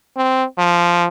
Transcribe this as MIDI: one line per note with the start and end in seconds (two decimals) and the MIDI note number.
0.17 0.44 60
0.58 1.07 53